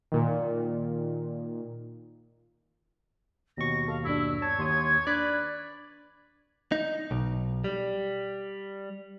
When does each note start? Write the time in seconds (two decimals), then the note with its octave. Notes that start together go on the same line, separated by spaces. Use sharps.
0.12 A#2 D#3
3.57 D#2 B2 C#6 A#6
3.88 A4 F5
4.05 G2 G3 D4 E4 E6
4.42 C#5 A5 G#6
4.59 D#2 C6 D#6
5.07 D4 B4 D5
6.72 D#4
7.11 B1
7.64 G3